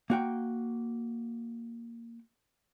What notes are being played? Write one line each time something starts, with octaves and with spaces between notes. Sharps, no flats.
A#3 F#4 G5